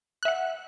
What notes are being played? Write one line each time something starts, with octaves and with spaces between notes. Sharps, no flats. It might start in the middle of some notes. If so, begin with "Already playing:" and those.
E5 F#5 F#6